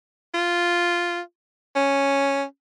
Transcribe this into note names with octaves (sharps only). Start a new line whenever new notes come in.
F4
C#4